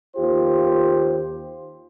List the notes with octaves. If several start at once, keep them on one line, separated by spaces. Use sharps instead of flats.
D#2 F4 G4 C5